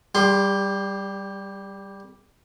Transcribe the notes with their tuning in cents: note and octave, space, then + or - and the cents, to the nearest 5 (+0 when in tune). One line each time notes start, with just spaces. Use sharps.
G3 -5 G4 +35 C6 +0